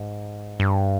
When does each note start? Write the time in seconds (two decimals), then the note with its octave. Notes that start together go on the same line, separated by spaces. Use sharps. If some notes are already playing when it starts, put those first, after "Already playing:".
Already playing: G#2
0.60 G2